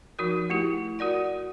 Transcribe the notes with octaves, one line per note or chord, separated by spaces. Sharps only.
F3 D#4 F#4 A#4
A3 E4 G4
F#4 A#4 D5 F#5